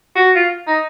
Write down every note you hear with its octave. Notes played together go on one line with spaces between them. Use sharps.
F#4
F4
D#4